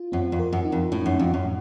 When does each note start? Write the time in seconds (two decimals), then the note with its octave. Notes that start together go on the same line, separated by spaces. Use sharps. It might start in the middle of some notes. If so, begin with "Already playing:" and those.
Already playing: F4
0.12 F#2 C4
0.32 F2
0.39 A#4
0.53 F#2
0.65 D#4
0.72 F2
0.92 A2 C#4
1.06 F#2
1.19 F2 C#4
1.34 F#2
1.45 A2